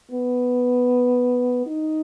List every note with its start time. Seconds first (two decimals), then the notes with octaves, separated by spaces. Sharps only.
0.11 B3
1.66 D#4